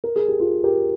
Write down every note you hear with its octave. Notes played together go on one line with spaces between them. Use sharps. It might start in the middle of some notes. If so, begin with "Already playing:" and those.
A#4
G#4
G4
F4 G#4
G4 A#4